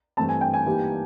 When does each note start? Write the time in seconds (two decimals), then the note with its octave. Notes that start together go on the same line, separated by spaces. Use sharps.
0.17 G2 E3 A3 C4 A5
0.29 G#5
0.41 G5
0.54 G#5
0.66 E3 G3 A#3 D#4 G4